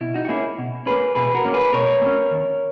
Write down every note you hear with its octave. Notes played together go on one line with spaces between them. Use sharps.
B2 E4
D#4 F#4
F#4
A#3 C#4 E4 G#4
B2
A#3 C#4 G#4 B4
B2 G#4 B4
F#4 A#4
A#3 C#4
G#4 B4
B2 A#4 C#5
A#3
C#4
D#2